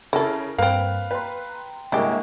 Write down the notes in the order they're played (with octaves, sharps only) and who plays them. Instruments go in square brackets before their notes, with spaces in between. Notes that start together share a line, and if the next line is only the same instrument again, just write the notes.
[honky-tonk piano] C#3 A#4 [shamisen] E4 A4
[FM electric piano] G2 [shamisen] A#3 C4 [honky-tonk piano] B4 [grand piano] F5
[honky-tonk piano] B4 [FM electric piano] G5 A#5 C6
[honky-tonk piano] G1 C2 [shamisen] E3 G4 [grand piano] G#3 A#3